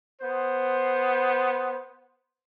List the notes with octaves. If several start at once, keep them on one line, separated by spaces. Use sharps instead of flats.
B3 C5